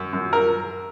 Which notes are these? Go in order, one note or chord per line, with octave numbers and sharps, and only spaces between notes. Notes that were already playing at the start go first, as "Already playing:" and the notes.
Already playing: F#2
F#2
A#4